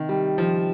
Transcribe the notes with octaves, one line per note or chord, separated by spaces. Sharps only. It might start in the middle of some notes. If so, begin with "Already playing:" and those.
Already playing: C3 D#3
G3
F3